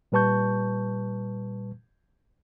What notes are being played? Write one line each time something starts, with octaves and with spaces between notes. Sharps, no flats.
A#2 G3 B4 A5 C#6 G6